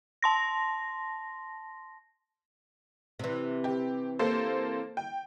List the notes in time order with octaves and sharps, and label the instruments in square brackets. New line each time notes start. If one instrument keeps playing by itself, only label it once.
[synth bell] A5 C6 A#6
[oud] C3 E3
[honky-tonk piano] G4
A#3 A4 C5
G5